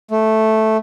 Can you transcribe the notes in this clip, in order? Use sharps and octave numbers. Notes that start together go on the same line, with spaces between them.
A3